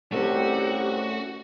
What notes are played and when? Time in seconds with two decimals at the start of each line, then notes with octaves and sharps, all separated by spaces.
0.12 C2 A3 C#4 F#4 G4